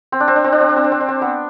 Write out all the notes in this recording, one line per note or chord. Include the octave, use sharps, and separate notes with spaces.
C4
D4
C4
D4
C4
D4
C4
D4
C4
D4
C4
D4
C4
B3